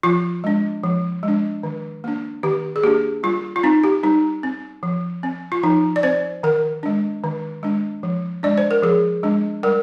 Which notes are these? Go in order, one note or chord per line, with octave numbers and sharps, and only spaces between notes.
F3 F4
G#3 D4
F3
G#3
D4
D#3
A#3 D4
D#3 G4
G#4
A#3 D4 G4
G3 F4
F4
C4 D#4
G4
G3 D#4
C4
F3
C4
F4
F3 D#4
D5
C4 C5
D#3 A#4
G#3 D4
D#3
G#3 D4
F3
G#3 D4 D5
C5
A#4
F3 G#4
G#3 D4
G3 A#4